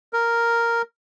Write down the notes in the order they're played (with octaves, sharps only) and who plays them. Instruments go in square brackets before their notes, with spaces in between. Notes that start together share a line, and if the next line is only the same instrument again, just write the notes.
[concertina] A#4